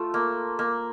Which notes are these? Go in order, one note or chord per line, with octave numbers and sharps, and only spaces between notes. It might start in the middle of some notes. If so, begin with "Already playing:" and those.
Already playing: A3 F4 C5
A#3
A#3